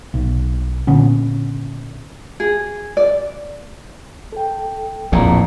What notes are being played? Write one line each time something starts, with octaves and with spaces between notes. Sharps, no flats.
B1
A#2 D3 B3 C#4
G#4
D5
A4 G5
A#1 E2 A2 C4 D5 A#5